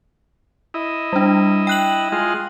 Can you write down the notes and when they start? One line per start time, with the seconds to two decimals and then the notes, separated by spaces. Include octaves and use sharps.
0.74 E4 D#5
1.13 G3 D4
1.67 G5 F#6 F#7
2.12 G#3 F4 D#5